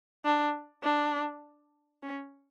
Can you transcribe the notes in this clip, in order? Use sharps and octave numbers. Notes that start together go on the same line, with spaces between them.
D4
D4
C#4